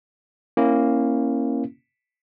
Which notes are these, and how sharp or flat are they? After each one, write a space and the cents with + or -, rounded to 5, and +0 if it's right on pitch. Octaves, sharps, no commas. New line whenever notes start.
A#3 +0 C#4 -30 E4 +0